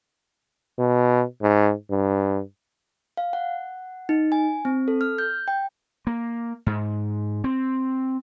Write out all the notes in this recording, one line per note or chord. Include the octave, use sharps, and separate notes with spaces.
B2
G#2
G2
F5
F#5
D#4
G#5
C4
A4
F6
G6
G5
A#3
G#2
C4